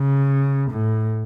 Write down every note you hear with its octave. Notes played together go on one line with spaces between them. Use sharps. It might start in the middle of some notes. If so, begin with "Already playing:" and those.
Already playing: C#3
A2